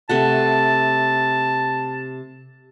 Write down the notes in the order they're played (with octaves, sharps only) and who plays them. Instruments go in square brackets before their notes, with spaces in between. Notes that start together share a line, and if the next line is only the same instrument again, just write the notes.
[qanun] C3 A3 F#5 [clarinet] A5